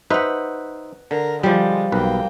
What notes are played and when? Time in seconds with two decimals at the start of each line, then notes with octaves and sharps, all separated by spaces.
0.10 D#4 B4 C5 E5 F#5
1.11 D3 A#4
1.43 F3 G3 G#3
1.92 B1 A#3 B4 G5